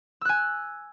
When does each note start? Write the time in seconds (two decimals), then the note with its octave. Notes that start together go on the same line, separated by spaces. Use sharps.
0.21 E6
0.25 F#6
0.29 G#5